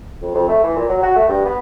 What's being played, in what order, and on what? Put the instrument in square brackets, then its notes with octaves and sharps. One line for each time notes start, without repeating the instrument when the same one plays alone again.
[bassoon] F2
F2
A3
E3
A#2
F#3
F#4
A3
G2
B3